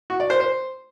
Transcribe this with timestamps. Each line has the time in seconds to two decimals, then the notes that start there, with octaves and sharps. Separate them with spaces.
0.10 F#4
0.20 D5
0.30 C5
0.40 C5